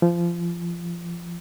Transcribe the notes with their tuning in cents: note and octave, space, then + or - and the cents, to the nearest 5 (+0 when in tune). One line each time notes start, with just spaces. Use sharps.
F3 -25